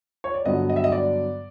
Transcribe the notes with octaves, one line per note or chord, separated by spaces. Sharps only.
C#5
D5
G2 D3 F#3 B3 D#5
D#5
E5
D#5
D5